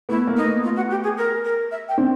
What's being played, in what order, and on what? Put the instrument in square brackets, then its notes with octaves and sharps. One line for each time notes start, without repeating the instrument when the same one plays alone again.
[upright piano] A3 B3 [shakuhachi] E4
[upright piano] A#3
[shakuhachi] D#4
[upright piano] A3 B3
[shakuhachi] F4
F#4
G4
G#4
A#4
A#4
E5
G5
[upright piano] C4 D4